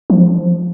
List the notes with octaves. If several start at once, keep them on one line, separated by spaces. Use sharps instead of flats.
F3